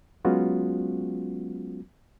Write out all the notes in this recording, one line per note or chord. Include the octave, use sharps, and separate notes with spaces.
F#3 G#3 B3 C#4 F4 F#4